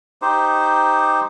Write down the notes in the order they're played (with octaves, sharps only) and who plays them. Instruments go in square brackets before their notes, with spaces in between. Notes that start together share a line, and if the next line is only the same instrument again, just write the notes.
[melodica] D#4 G4 C5